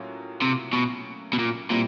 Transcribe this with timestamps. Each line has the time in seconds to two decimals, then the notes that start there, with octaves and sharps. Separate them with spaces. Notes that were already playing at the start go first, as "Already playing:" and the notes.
Already playing: A2 F#3 A#3 C#4 F4
0.42 C3
0.73 B2
1.33 B2
1.39 A#2
1.70 A#2 G3 C4 E4